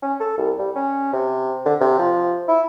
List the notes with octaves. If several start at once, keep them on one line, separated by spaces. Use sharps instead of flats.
C#4
A4
C2
G3
C#4
C3
D3
C3
F3
E4